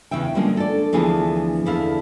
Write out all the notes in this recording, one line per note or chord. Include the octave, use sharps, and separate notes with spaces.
E2 C#3 E3 E5 G5
D3 F3 G3 G#3 A#3 C#4
A4 D5
D2 E3 F3 B3 G#4 A5
E2 D3 E4 G#4 A4 F5